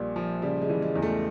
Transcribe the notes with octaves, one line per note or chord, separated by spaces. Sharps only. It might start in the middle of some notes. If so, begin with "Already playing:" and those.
Already playing: A#1 A#2 G3
F3
C#3 G3
G#3
E3
G#3
E2
A3